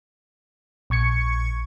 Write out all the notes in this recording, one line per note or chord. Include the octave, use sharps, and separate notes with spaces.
A#1 C#6 G#6 C#7